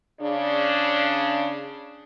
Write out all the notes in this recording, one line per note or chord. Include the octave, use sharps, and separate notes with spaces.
C#3 D4